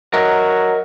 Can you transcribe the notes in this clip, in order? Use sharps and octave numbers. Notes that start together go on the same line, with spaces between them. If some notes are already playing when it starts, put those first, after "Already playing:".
F#3 A#4 D#5 E5